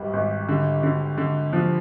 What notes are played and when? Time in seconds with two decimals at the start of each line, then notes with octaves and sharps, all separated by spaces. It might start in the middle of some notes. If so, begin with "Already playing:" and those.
Already playing: G#1 G2 G3
0.13 G#1
0.49 D3
0.83 D3
1.18 D3
1.53 F3